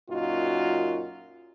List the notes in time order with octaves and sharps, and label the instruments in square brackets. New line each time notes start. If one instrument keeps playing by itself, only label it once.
[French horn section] F#2 A#2 D#4 F4 F#4